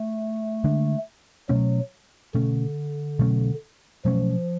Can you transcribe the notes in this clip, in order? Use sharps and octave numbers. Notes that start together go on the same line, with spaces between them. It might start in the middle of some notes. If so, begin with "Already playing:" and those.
Already playing: A3
D3 G#3 D4
B2 F#3 A3 C#4
B2 D3 A3 C#4
B2 F#3 A3 C#4
B2 F3 F#3 A3 C#4